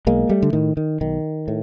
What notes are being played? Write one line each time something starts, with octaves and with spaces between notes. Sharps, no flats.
B1 G#3 A#3
G3 A3
D3
A2 D#3
D#3
B1 D#3
A2